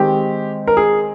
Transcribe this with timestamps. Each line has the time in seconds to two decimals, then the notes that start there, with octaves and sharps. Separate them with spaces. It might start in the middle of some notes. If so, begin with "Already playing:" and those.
Already playing: D#3 G#3 C4 D#4 G4
0.67 A#4
0.77 G#4